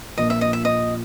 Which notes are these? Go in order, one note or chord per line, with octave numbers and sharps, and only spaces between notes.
A#1 A#2 F3 A#3 D#5
E5
D#5
E5
D#5